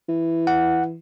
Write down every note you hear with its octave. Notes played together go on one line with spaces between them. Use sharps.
E3
F#5